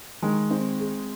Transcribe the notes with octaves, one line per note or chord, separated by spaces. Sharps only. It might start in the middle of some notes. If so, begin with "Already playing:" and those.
D#3 G#3
C4
G#4